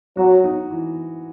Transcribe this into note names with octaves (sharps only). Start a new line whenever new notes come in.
F#3 F#4
D#4
E3